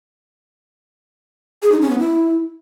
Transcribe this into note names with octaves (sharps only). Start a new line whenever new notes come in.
G#4
D#4
C#4
B3
E4